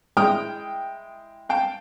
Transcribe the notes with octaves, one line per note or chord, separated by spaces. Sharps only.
G#3 E4 G5 D#6 F6
F5 G5 A5